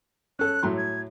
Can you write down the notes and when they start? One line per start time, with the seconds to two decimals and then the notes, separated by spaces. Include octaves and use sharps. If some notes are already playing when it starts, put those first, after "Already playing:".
0.39 C#4 A4 F#6
0.63 A2 F#3 C6
0.77 G#6